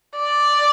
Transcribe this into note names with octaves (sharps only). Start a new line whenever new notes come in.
D5